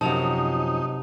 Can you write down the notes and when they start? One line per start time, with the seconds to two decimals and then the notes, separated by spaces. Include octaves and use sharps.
0.01 F#2 C3 F3 F#3 D#4 A5 F7